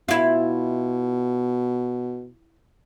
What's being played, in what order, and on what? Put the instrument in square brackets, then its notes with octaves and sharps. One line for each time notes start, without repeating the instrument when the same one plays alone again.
[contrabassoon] B2 [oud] E4 F4